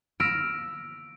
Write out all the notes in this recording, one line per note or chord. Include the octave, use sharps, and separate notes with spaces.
E6 F6 A#6 B6 D7